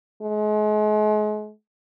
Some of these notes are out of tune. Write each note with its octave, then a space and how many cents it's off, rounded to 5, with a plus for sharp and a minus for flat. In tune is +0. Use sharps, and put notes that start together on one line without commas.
G#3 +35